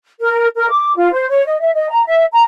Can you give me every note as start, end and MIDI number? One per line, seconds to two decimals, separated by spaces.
0.20 0.46 70
0.56 0.69 70
0.69 0.94 86
0.96 1.09 65
1.12 1.28 72
1.29 1.43 73
1.46 1.56 75
1.59 1.72 76
1.73 1.88 75
1.89 2.02 82
2.06 2.23 76
2.32 2.42 82